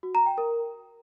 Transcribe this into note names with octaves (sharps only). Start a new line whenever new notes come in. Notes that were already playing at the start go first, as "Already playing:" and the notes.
F#4
A#5
G5
A#4